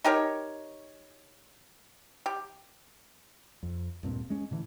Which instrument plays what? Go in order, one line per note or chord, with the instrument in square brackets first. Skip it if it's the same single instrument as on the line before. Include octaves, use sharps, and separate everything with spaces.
[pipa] D#4 G4 A#4 C#5
G4
[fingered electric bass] F2
D1 G2 A#2 C4
G#3 C#4
A2 D3 E3